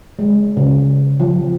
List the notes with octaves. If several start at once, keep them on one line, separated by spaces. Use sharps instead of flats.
G#3
C#3
F3